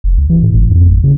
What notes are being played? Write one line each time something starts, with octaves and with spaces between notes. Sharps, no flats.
F1
C#2
E3
A2
G1
F2
G#1
C#3